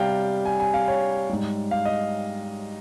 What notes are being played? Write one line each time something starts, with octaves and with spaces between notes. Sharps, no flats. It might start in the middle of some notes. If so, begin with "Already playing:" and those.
Already playing: C3 G3 F5 G5
G#5
G#5
F5
C#5
G#2 G3
F5
D#5